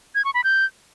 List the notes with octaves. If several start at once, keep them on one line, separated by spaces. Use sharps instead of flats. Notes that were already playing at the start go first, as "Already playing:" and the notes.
G#6
C#6
B5
G6